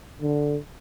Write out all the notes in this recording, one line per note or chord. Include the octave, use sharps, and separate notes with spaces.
D3